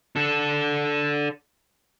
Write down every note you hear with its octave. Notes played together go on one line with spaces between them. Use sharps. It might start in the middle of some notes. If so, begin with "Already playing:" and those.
D4 A4